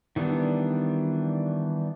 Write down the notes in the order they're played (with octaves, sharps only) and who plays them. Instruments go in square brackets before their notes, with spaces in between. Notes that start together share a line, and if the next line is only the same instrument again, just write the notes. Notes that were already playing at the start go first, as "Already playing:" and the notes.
[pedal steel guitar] D#3 E3 G3 B3 D4